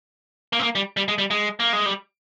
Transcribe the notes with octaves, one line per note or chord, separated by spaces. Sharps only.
A#3
C4
A#3
G3
G3
G#3
G3
G#3
A#3
G#3
G3